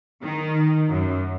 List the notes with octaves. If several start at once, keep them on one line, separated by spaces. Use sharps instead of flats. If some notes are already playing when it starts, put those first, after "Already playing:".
D#3
F#2